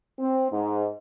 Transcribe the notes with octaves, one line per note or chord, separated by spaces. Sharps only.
C4
G#2